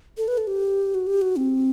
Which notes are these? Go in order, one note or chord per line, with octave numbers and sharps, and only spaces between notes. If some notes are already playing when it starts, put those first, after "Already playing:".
A4
B4
A4
G4
F#4
G4
F#4
C4